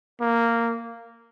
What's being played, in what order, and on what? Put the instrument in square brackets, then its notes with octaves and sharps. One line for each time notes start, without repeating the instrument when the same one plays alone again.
[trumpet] A#3